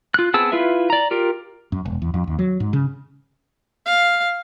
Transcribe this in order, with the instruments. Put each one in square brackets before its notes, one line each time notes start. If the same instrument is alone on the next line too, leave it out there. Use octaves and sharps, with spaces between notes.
[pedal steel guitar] F4 F#6
B3 C4 G#4 A5 E6
E4 F4 B4 E5
D5 A#5
F4 G4 A#4
[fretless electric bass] F#2
E1
E2
F2
D#2
F#3
G#2
C#3
[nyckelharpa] F5